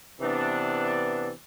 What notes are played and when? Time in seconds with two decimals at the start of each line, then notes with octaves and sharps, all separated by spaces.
0.21 C3 E3 B3 D4